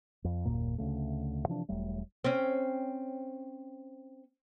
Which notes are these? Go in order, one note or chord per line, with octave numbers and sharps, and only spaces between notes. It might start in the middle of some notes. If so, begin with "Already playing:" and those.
F2
F#1 D#2 A#2 A#3
D2 C#3 A3
C3 E3 F3 D4
E1 F#3 G3 A3
C4 C#4